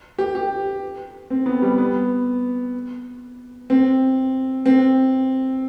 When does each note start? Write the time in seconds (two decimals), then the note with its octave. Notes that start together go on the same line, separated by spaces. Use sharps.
0.18 G4
0.35 G4
1.30 C4
1.46 B3
1.62 G3
1.78 B3
3.70 C4
4.66 C4